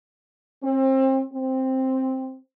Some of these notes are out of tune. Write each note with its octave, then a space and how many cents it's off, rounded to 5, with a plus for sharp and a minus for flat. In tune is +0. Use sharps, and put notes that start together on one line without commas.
C4 +30
C4 +5